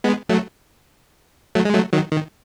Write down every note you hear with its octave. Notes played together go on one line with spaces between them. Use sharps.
G#3 B3
F#3 A3
F#3 A3
G#3
F#3 A3
D#3 F#3
D#3